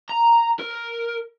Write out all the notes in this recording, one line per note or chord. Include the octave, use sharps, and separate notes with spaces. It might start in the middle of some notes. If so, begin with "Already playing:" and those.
A#5
A#4